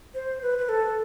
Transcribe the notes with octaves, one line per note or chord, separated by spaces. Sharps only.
C5
B4
B4
A4